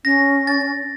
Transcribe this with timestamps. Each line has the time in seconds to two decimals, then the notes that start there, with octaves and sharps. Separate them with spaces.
0.05 C#4 A#6
0.47 A6